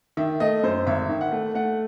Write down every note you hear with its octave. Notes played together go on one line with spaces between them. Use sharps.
D#3 E5
A3 D#5
F#2 C5
G#1 E5
D#3
F#5
A3
A3 F#5